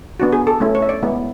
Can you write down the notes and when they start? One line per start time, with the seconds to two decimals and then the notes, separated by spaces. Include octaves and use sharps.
0.20 B3 D4 F#4
0.32 G#4
0.47 A4
0.60 A3 C#4 E4
0.75 C#5
0.82 E5
0.89 D5
1.03 G#3 B3 E4